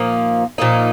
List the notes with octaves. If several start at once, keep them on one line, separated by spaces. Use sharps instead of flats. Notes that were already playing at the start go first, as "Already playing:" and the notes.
Already playing: A#2 F3 A#3 D#4
A#2 F3 A#3 D#4